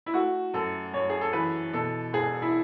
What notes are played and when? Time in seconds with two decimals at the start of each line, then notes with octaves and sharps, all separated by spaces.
0.06 E4
0.14 A3 F#4
0.54 F#2 A4
0.93 F#2 C#5
1.09 G#4
1.21 A4
1.33 E3 B4
1.73 B2 A4
2.13 E1 G#4
2.42 E4